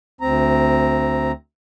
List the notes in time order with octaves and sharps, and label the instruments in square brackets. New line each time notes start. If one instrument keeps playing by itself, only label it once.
[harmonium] D2 C4 A#5